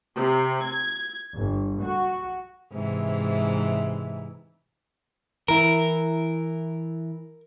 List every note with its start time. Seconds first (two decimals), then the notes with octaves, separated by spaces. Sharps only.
0.17 C3
0.66 G#6
1.35 G1
1.81 F#4
2.72 G#2 C3 E3
5.48 E3 E4 A#4